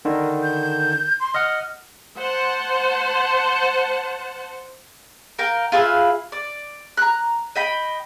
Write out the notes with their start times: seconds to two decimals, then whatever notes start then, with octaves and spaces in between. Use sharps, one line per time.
0.05 D3 D#3 A#4
0.43 G6
1.20 C6
1.34 D#5 F#5 F6
2.17 C5 F#5 A5
5.39 A#4 F5 G5
5.72 F4 G#4 B4 E5
6.32 D5
6.97 A#5 F#6
7.56 D#5 G5 B5